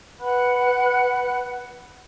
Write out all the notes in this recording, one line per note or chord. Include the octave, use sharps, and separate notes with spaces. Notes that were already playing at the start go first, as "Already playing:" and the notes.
B4 F#5 B5 F#6